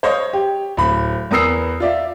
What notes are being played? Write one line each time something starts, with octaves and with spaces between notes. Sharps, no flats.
C5 C#5 D#5 F5
G4
D1 B5
E2 B3 A#4 D#6 E6 C7
F4 D5 E5